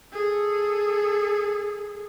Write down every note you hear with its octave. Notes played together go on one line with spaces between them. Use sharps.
G#4 A4